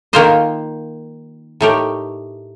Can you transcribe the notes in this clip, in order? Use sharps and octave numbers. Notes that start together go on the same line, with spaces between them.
D#3 A#3 F4 C5 D#5
A2 A3 D#4 G4 A#4